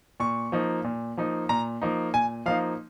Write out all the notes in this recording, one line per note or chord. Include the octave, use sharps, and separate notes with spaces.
A#2 C#6
F3 A#3 D#4
A#2
F3 A#3 D#4
A#2 A#5
F3 A#3 D#4
A#2 G#5
F3 A#3 D#4 F5